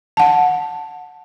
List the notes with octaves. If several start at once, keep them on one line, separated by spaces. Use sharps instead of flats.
F#5 A5